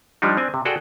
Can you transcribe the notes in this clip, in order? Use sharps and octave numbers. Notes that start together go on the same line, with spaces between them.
F3 G3 D4 D#4
C4 D4 G#5
C3
F#4 G#4 A4 D5 G5